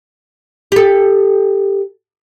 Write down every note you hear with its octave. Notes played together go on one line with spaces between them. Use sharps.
G4 A4